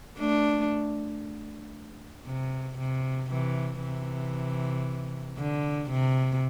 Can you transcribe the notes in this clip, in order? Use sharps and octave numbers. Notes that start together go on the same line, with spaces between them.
A3 D4
C3
C3
C3 E3
C3 E3
D3
C3